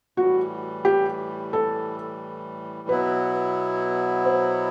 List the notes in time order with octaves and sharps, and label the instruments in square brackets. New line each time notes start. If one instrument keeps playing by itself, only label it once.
[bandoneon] A2 E3 G3 [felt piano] F#4
[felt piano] G4
A4
[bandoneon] B2 F#3 B3 E4 [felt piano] B4
[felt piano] C5